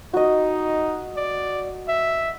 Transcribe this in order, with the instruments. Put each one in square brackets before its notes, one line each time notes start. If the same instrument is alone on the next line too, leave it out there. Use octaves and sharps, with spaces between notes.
[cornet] D#4 [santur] F#4 D#5
[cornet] D5
E5